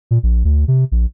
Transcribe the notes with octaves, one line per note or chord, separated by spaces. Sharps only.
A#2
A#1
D2
C3
A#1